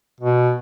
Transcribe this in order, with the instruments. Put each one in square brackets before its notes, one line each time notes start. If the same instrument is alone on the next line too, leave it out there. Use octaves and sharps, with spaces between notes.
[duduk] B2